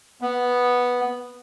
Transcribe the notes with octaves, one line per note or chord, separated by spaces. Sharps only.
B3